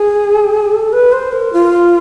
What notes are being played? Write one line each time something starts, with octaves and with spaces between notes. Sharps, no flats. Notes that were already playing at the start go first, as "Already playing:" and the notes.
Already playing: G#4
A4
B4
C5
A#4
F4